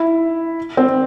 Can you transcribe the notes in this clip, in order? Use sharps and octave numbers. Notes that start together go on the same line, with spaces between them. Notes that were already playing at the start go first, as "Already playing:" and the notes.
Already playing: E4
C4